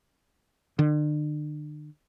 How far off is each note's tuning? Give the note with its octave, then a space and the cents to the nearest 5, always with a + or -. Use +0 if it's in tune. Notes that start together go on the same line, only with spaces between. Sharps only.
D3 +40